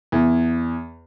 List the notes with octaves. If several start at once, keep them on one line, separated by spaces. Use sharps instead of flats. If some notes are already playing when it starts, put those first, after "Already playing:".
E2